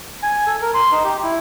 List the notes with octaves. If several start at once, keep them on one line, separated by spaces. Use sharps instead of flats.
G#5
A4
A#4
C6
D#4
G4
E4